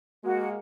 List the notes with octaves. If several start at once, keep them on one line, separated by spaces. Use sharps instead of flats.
G#3 A#3 F#4